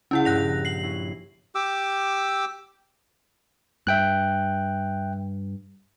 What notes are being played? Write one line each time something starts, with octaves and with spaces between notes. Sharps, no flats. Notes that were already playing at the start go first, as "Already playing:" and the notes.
C#2 C#4 E4 F#5
A#1 G2 F#6 A#6 F7
C7 F#7
C#4 E4
G4 D6 E6
G2 E5 G5 F#6